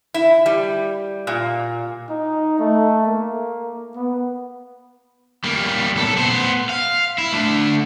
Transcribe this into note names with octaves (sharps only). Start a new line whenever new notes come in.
E4
G3
A#2
D#4
A3
A#3
B3
G3 A#3
B1 A4
B3 C5
F5
E4
A3 D4